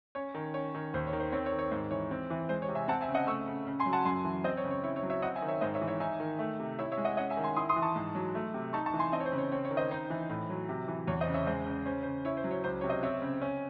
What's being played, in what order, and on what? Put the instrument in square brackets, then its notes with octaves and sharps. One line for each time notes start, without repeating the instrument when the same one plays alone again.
[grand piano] C#4 C#5
D#3
C#4 C#5
D#3
D#2 C5
C#5
D#3
C5
C4 C#5
C#5
D#3
C#5
G#2 C5
E3 C#5
C4
E3
G#3 C5
C#5
C3
E5 G#5
C4 F#5 A5
E5 G#5
C#3
D#5 F#5
A3 C#6 E6
C#3
C#3
G#5 C6
F#3
F#5 A5
F#2 G#5 C6
E3
C4 C5 D#5
C#5
C#3
C#5
E4 C#5
C#5
F#3
C#5 E5
C4 D#5 F#5
E5 G#5
D#3
C#5 E5
G#2 C5 D#5
C#5 E5
E3
C#5 E5
D#4 E5 G#5
D#3
A3
C3
E4 C#5 E5
C#5 E5
G#3
D#5 F#5
C#4 D#5 F#5
E5 G#5
D#3
G#5 C6
E4 C6 D#6
C6 D#6
E3
A5 C#6
G#2
F#3
A3
C3
D#4 A5 C#6
A5 C#6
E3
G#5 C6
C4 C5 D#5
C#5
C5
C#3
C#5
C4 C#5
C#5
D#3
C5 D#5
D#4 C5
E3
A2
F#3
C3
E3
E2 C#5
C5 D#5
C#3
C#5 E5
G#3 C5 D#5
C#3
C#4 C5
C#3 C5
E4 C#5
C5
F#3
C#5
C#2 C5
C3 C#5
C5 D#5
C4 C#5 E5
C#3
C#4